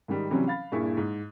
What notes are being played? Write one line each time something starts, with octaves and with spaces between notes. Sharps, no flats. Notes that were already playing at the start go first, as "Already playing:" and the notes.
G#2 D#3 G3
C3 E3 F#3 G3 C4 C#4
F5 B5 A6
G2 A#2 E4 G#4 C#6
G#2